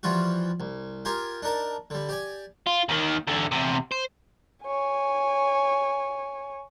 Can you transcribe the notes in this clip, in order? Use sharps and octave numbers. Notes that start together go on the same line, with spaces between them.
E3 F3 G3 F4 F#4
C2
F4 G4 A#4 G#5
D4 D#4 A#4 A5
D3 G3
G4 D5 G#5
F4
D#2 D#3
E2 D3
E2 C3
C5
C#5 G#5